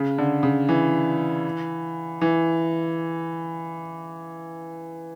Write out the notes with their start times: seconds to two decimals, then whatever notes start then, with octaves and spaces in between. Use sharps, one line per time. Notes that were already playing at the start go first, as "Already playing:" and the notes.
Already playing: C#3
0.18 D3
0.43 C#3
0.69 E3
2.21 E3